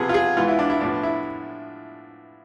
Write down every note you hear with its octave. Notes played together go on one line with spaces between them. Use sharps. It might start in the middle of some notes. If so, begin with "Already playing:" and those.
Already playing: C3 F3 B3 G#4
F4
G#4
G#2 E3 B3 F4
E4
D4
E4
A2 F3 B3 D4
E4